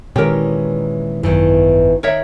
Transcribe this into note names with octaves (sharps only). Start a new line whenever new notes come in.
A#2 D#3 E3 G#3 C#4 G4 A#4
G#1 F#2 B2 D#3 E3
D#3 A#4 C#5 E5